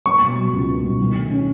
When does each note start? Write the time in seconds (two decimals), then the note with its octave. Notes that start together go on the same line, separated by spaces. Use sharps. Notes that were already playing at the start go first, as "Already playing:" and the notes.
0.06 B3 C#6
0.22 B2
0.37 F#3
0.53 C#2
0.68 B3
0.84 B2
0.99 D#3
1.15 A3
1.31 C#4